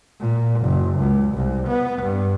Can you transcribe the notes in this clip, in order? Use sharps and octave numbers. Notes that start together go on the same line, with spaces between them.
A#2
F#1
C#2
C2
B3
G2